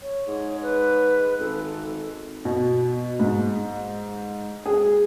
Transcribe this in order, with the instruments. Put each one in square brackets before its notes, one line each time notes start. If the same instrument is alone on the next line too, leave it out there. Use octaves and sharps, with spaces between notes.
[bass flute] C#5
[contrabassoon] G#2
[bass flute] B4
[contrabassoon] G#1 [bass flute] A4
[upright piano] B2
G#2
G#4